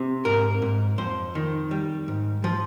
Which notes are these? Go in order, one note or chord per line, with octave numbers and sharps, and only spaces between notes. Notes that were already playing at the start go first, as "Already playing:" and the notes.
Already playing: C3
G#2 A#4
G#2
F2 C5
D#3
G3
G#2
F3